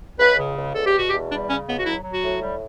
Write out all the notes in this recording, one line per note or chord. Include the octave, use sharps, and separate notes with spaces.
C#2 B4
C#3
C#2
E2 A4
G4
B2 F#4
G4
E2
G3 D4
C#3 C#4
C#2 B3
F#4
F#3 E4
F#3
F#4
A2
G3